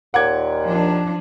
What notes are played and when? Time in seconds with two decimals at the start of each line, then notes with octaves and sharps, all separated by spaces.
0.14 D#2 A#2 F#5 D6 G#6
0.65 F3 D4